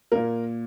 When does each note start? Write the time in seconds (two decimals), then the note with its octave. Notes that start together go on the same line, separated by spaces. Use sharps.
0.12 A#2 A#3 A#4